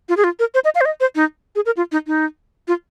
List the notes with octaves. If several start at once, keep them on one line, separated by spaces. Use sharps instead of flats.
F4
G#4
F4
A#4
C5
D#5
F5
C5
D#5
C5
D#4
G#4
A#4
F4
D#4
D#4
F4